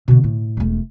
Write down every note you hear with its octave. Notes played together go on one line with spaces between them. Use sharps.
B2 D3
A2
E1 A3